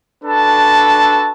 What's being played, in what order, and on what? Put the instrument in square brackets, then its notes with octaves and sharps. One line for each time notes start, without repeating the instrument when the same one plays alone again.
[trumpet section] D4 F#4 A4 B4 A5